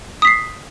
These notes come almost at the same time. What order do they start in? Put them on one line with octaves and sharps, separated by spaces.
D#6 B6 C7